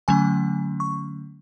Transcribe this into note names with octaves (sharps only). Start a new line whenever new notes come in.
D3 F#3 A3 C#4 G#5
C#6